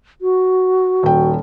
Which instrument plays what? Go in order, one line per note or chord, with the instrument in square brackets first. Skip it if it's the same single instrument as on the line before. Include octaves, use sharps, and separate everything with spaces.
[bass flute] F#4
[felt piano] D#1 G5